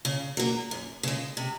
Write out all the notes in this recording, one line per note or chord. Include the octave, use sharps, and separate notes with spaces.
C#3
F#3 A#3
F#2
C#3 G#3
C3